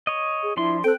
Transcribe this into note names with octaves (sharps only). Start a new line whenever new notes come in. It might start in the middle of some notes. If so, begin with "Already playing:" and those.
C#5 D#5
G#4
F3 D4 E4 C6
C4 A4 G5 F#6